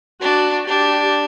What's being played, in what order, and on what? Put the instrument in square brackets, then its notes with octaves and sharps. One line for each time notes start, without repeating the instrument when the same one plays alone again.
[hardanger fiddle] D4 [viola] F#4
[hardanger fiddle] D4 [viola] G4